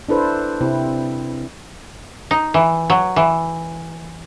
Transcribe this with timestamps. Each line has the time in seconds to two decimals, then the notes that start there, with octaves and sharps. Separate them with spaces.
0.09 D4 E4 A4 B4 C5
0.61 C3 C4 E4
2.31 D#4
2.54 E3
2.90 F#3
3.16 E3